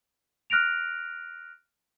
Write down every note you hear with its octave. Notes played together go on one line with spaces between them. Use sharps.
F6 F#6 A#6 D7 F7